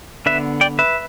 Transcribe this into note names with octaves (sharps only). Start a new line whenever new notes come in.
D3 B3 B4 E5
D5 G5
B4 E5